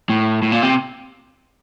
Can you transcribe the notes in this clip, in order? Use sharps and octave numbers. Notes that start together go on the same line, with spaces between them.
A2
A2
A#2
C3